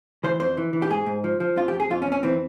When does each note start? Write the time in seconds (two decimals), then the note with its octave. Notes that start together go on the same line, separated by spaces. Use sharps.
0.24 E3 C5
0.40 F2 C5
0.57 E3
0.73 E3
0.82 G4
0.90 G#2 G#4
1.06 G#2
1.24 F3
1.40 F3
1.56 F2 F4
1.68 G4
1.73 F2
1.80 G#4
1.90 F2 F4
2.02 C#4
2.07 F2
2.12 C#4
2.23 E3 C4